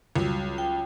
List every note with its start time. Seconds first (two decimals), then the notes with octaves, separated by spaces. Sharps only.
0.16 C#2 F#3 G3
0.58 G5